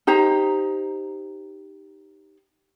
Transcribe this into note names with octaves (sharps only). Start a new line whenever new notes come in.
D#4 G4 C5 A#5